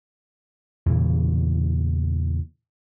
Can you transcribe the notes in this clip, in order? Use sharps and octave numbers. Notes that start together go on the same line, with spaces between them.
E2 A#2 C#3 E3